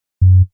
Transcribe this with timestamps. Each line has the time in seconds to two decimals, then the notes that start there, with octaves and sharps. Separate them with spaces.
0.21 F#2